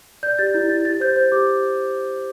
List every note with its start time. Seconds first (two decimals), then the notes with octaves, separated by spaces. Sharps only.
0.23 D5 G6
0.39 G4 A6
0.54 E4 G6
0.69 E4 A6
0.85 G4 A6
1.00 C5 G6
1.16 C5 G6
1.32 G4 D6